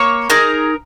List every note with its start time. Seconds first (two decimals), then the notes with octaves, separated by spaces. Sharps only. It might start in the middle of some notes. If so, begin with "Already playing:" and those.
Already playing: A#3 C#5 C#6
0.30 D#4 G#4 A#4 A#5